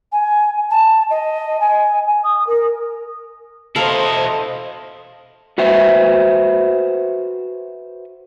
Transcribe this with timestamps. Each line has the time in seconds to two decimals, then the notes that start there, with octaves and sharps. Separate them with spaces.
0.12 G#5
0.71 A5
1.10 D#5
1.60 G#5
2.24 D#6
2.47 A#4
3.76 B2 E4 A4 C5 D#5 F5 A#5
5.58 F#4 B4 C5 E5